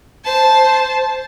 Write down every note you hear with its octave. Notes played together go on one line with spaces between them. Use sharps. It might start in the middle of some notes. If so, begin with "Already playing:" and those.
C5 A5